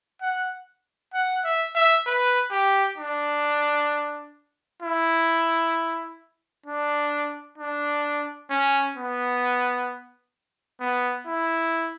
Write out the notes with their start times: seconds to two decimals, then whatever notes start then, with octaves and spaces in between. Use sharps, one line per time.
0.22 F#5
1.14 F#5
1.44 E5
1.75 E5
2.07 B4
2.51 G4
2.98 D4
4.82 E4
6.66 D4
7.58 D4
8.50 C#4
8.97 B3
10.80 B3
11.27 E4